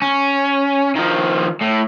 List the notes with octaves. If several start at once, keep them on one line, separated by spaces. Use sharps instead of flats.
C#4
D#3 F3
A2